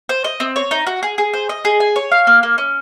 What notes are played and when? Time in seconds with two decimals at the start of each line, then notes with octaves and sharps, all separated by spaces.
0.09 C5
0.24 D#5
0.40 C4
0.56 C#5
0.71 D#4
0.87 F#4
1.03 G#4
1.18 G#4
1.34 C5
1.49 D#5
1.65 G#4
1.80 G#5
1.96 C#5
2.12 F5
2.27 A#3
2.43 A#3
2.58 C#4